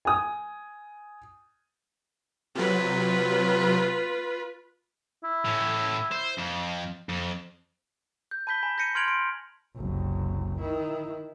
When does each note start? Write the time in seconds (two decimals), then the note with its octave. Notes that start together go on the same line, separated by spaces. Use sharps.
0.05 G#5 D#6
2.55 C3 F#3 F4 B4
5.24 E4
5.45 A2 C#4
6.12 C5
6.39 F2
7.09 F2
8.31 G6
8.47 A5 B5 G6 B6 G7
8.63 G#5 A#5 B5
8.78 G6 A#6 C#7 D#7
8.95 C6 F6 G#6 D7 F7 F#7
9.08 C6 D7
9.76 F#1 C2
10.60 D#3 E4